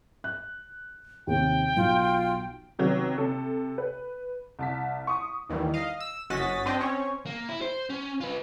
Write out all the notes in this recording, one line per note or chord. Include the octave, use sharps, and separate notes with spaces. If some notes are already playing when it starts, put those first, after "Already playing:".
F#6
D#2 C3 G5
B1 F4
C3 D#3 F#3 B3
C3 A4
B4
C2 A5 B6
C#6 D#6
D#2 D#3 E3 G3
D#5 F5
E6
G1 C#4 F#4 D#5 A6 B6
C4 D4 C5 D#5 G5
C4 C#4 C#5
A#3
E4
C5
C#4
F4 B4